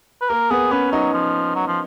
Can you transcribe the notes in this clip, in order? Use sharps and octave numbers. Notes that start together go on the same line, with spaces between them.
B4
A#3 A#4
B3 G#4
B3 C#4
F#3 D#4
F3
F#3
F3